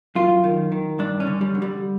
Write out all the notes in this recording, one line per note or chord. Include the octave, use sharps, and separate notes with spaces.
F#2 F4
D#3
D#3
G2 D4
C#4
D3
G3
D3
G3